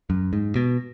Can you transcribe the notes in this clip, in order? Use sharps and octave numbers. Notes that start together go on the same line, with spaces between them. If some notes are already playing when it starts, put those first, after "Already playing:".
F#2
G#2
B2